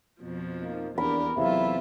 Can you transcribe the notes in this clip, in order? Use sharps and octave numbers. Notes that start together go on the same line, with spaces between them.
F2 B2 F3
A#3 D#4
E2 A#3 B3 D4 G4 A#4 B5
E2 C3 F#3 A3 E4 F4 E5 F5